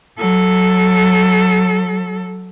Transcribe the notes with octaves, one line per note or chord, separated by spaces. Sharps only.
F#3 A4